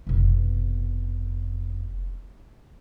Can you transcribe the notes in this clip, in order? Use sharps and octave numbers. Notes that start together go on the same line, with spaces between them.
F1 B2